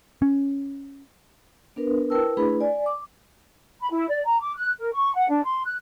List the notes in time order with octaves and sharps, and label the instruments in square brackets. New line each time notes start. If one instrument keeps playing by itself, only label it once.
[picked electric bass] C#4
[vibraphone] B3 D4 A#4 B4
E4 A#4 B4 G5 A5 E6
A3 D4 E4 G#4 B4 B5
D5 G#5
D6
[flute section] B5
E4
D5
A#5
D6
F#6
A#4
C#6
F#5
D4
C6
F#6